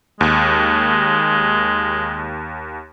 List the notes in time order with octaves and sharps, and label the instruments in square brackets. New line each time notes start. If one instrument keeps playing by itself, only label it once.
[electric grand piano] D#2 [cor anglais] G#3